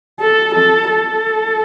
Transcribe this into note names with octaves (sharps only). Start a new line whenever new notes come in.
A4
A4
A4